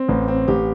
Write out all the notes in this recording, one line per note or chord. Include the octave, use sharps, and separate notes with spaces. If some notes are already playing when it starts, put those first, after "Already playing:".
Already playing: C4
A1
C4
A1 G4